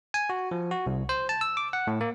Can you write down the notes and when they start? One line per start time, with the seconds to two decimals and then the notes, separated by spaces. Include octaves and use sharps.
0.14 G#5
0.30 F#4
0.51 F3
0.71 F#4
0.86 C2
1.09 C5
1.29 A5
1.41 E6
1.57 D6
1.73 F#5
1.87 A2
2.01 A#3